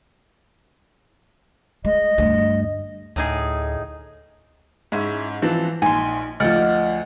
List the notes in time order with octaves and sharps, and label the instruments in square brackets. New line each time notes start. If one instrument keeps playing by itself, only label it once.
[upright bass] G#3 [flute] D#5
[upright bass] D2 G2
[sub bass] D2 [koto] A2 D#4 G#4
[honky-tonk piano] G#2 [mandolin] C#4 E4 E5
[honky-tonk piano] E3 F3 [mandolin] C4 D4
[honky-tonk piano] A#1 [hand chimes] D#4 [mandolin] G#5 C6
[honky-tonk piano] D2 F3 [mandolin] D5 F#5 F6 [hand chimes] D#5